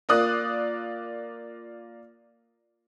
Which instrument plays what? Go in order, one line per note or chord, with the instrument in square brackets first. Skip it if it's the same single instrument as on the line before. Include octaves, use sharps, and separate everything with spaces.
[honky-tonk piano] A#3 F4 D5 D#6 F#6